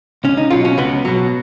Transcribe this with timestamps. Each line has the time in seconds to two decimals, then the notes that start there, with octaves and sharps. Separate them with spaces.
0.24 C#2 C#4
0.37 D#4
0.51 B2 F#3 F4
0.65 C#4
0.78 C#2 B3
1.05 B2 F#3